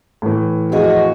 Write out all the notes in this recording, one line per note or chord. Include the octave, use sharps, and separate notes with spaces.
A2 E3
F2 F#4 G#4 D#5